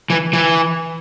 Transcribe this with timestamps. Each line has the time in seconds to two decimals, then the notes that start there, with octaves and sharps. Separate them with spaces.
0.10 E3
0.33 E3